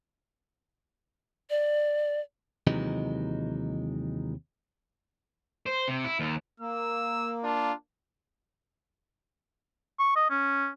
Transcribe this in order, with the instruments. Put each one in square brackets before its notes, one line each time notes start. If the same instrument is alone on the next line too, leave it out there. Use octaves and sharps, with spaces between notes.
[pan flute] D5
[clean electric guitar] D#2 C3 E3 F#3 G#3 D#4
[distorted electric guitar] C5
C3
E4
D#2
[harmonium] A#3 [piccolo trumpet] E6
[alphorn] D4 [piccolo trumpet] F4
[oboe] C#6
D#5
C#4